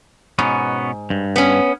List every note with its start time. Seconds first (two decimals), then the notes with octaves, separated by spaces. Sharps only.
0.39 G#2 B2 B3 C#4
1.10 G2
1.36 B3 C#4